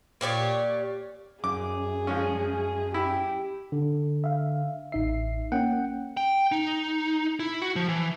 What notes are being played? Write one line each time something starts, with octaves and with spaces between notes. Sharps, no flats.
A#2 G4 C#5 D5
F#2 G#4 D6
F3 G#3 C#4
E4 G4
D3
E5 F5
A1 D#4 E5 C7
A#3 C#4 F#5 G5
G5
D#4
E4
F#4
F3
E3